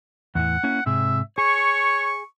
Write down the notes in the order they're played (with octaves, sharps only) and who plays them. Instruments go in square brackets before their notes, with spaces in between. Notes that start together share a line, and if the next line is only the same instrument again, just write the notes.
[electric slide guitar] E2 A2 E3 [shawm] F#5
[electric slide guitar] A#3 C#4 E4
[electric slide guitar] G#2 C3 G#4 [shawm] E5
[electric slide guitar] G#4 [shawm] C#5 [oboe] C#6